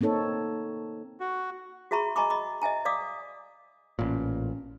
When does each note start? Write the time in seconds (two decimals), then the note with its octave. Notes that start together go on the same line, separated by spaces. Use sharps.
0.01 A#3 C4 D#4 A4 C#5
1.20 F#4
1.91 F#4 G#4 E5 A#5 B5 C#6
2.16 D#5 G#5 A#5 B5 C#6 D6
2.30 D#5 B5 D6
2.62 D#5 E5 G#5 A#5
2.85 D5 F5 D6 D#6
3.99 A1 A#2 C#4